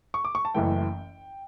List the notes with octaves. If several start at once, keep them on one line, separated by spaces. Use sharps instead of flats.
C#6
D6
C#6
A5
F#1 F#2 E3 A3 G5